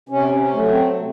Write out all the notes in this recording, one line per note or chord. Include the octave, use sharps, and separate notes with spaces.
C3 C#4
C#4
F#3 A3
C4
C3